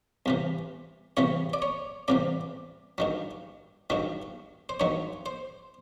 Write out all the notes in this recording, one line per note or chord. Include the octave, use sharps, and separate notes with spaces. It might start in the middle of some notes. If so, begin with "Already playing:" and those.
C2 C3 E3
C2 C3 E3 C#5
D5
C#5
C2 C3 E3 D5
G2 D#3 F#3
G2 D#3 F#3
C5
G2 D#3 F#3 C#5
C5